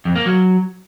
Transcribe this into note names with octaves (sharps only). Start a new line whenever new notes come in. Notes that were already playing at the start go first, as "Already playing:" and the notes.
F2
A#3
F#3